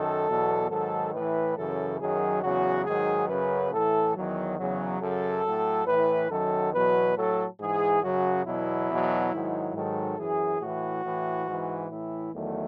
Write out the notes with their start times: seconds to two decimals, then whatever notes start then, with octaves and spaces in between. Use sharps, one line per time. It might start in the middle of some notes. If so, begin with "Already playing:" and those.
Already playing: F#2 D#3 A4
0.27 E2 B2 F#3
0.70 G#2 D#3 F#3 A4
1.14 A2 E3 B4
1.56 F#2 C#3 E3 A4
1.99 F#2 D#3 F#3 G#4
2.42 E2 C#3 F#3 F#4
2.85 G#2 D#3 F#3 G#4
3.28 F#2 C#3 F#3 B4
3.72 A2 E3 A4
4.15 E2 D#3 F#3
4.58 E2 C#3 F#3
5.01 F#2 C#3 F#3 A4
5.44 A2 F#3
5.87 A2 E3 B4
6.30 F#2 D#3 F#3 A4
6.73 E2 B2 F#3 B4
7.16 A2 F#3 A4
7.60 G#2 E3 G#4
8.02 F#2 C#3 F#3 F#4
8.45 E2 B2 F#3 E4
8.89 E2 B2 F#3
9.32 G#2 D#3 F#3
9.74 G#2 D#3 F#3 A4
10.18 F#2 E3 G#4
10.60 A2 E3 F#4
11.04 A2 E3
11.47 G#2 E3
11.90 A2 E3 E4
12.33 E2 D#3 F#3 A3